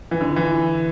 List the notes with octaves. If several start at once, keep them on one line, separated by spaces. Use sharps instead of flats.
E3
D3
E3